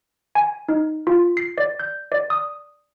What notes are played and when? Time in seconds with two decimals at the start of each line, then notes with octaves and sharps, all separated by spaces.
0.35 G#5
0.68 D#4
1.07 F4
1.37 C7
1.58 D5
1.79 G6
2.12 D5
2.30 D#6